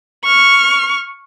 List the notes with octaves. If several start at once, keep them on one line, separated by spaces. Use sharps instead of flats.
C#6 F6